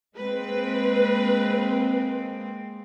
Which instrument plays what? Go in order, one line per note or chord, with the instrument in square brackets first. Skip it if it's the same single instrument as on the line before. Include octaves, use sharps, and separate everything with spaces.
[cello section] G#3 A#3 C4 [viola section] B4